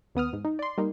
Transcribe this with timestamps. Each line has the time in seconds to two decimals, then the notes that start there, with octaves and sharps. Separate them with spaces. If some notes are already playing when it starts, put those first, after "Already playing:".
0.15 D#2 B3 D#6 F6
0.33 G#2
0.45 D#4
0.59 D5 C6
0.78 G3 A#3 D#4